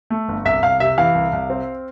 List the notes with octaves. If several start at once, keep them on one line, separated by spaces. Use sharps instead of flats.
A3
G1
C2 E5
C2 F5
C3 E5
E3 F5
C2
C2
C4